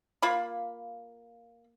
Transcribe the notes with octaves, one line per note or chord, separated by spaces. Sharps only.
A#3 F4 B5